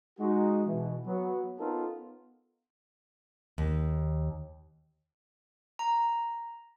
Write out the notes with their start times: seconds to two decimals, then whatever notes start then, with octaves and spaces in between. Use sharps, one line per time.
0.20 G#3 D#4 F#4
0.66 B2 E3
1.06 F#3 B3
1.59 B3 C#4 D#4 F4 A4 A#4
3.58 D#2
5.79 A#5